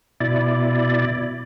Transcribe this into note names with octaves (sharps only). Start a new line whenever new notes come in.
B2 E4 D5